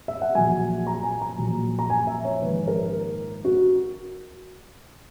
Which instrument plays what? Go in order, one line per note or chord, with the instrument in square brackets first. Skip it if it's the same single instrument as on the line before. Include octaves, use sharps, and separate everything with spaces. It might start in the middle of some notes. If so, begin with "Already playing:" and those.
[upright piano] E5
F#5
A#1 A#2 F#3 G#5
A#5
G#5
A#5
A#1 A#2 F#3
A#5
G#5
E5
C#5
A#1 G#2 D#3 B4
A#4
F#4